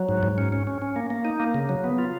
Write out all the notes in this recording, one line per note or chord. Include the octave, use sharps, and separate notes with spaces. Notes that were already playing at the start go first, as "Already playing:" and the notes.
Already playing: F#3
G#2
G#2
C#4
C#4
C#4
C#4
A#3
A#3
D#4
A#3
C#3
F#3
B3
F4